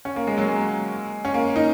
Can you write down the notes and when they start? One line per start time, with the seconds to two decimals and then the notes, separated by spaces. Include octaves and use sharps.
0.05 C#4
0.16 A#3
0.27 G#3
0.38 F#3
0.48 G#3
1.25 C#4
1.34 A#3
1.56 D#4